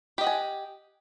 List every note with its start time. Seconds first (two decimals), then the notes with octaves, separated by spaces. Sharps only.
0.18 G4
0.21 D#5
0.24 F#5
0.27 G#5